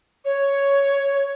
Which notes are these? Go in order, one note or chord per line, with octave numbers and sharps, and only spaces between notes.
C#5